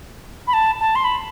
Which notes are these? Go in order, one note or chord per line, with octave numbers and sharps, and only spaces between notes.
B5
A5
A5
C6
B5